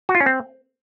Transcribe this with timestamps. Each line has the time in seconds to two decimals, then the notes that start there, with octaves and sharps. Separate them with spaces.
0.09 F#4
0.15 F4
0.20 C#4
0.26 C4